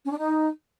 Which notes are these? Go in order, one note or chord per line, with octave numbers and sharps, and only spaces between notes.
C#4
D4
D#4